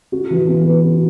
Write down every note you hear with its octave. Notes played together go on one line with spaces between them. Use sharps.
F#4
E3
B3
B4
F#4